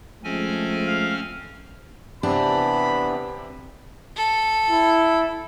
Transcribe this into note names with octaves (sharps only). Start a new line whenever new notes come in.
F3 G#3 A3 C4 C#4 G#5
F5
C3 E3 B3 C4 D4 G4 B5
A4
E4